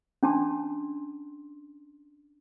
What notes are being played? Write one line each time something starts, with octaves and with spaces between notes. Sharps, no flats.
C#4 D4 A5 C6